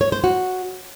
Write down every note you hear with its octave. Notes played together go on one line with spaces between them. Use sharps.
C#5
C5
F#4